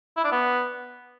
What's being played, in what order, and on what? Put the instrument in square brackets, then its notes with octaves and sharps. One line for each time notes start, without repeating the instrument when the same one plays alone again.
[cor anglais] E4
D4
B3